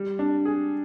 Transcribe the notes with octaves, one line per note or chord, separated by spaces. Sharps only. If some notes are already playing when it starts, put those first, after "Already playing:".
Already playing: G3
D4
G#4